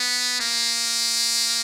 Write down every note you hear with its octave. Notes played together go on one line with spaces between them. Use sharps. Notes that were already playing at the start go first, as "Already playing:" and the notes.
Already playing: B3
A#3